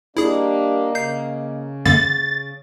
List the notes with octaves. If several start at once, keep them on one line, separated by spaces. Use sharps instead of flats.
G3 A#3 D4 E4 G#4 D#5
C#3 G6 C7
F#2 D3 A#3 A6